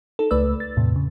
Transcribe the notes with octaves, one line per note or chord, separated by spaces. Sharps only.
D#4 A4
C#2 A3 B4 D5 E6
A6
E2 A2 C3
C#3